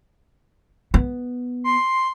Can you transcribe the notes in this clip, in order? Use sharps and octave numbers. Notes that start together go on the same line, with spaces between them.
B3
C6